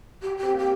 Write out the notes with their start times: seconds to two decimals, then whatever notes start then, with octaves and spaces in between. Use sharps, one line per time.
0.22 G4
0.37 G4
0.43 C4
0.54 A#3 G4